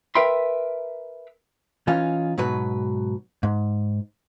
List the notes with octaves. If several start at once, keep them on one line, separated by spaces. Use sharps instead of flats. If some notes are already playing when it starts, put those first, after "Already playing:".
A#4 B4 E5 G5 B5 C6
E3 C#4 D#4 F4
G#2 B2 F#3 B4
G#2